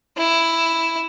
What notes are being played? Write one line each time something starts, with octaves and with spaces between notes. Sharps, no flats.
E4